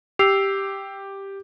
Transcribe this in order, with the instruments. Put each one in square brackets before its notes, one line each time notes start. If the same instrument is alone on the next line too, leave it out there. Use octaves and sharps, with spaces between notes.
[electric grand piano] G4 [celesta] E6 C7 F7